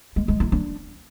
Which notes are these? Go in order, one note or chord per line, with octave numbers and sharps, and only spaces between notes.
G#3
G#3
E4
D4